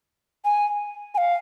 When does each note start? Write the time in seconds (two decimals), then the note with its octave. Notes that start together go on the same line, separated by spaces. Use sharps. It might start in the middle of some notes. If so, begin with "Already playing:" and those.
0.45 G#5
1.15 G#5
1.18 F5